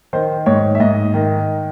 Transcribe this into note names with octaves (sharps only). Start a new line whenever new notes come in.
D#3 C5
G#2 C#5
E5
G#2 D#5
D#3